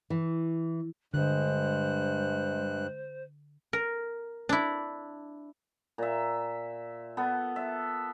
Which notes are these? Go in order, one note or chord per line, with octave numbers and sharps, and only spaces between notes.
E3
G2 D3 G#3 C5 F#6
A#4
D4 E4
A#2 E5
B3 A4
E5